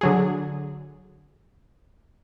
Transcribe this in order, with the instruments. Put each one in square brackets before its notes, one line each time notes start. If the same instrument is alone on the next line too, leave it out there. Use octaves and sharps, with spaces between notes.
[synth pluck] D3 F#3 G#4